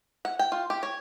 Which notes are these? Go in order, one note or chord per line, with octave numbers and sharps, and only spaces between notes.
F#5
G5
F4
G4
C#5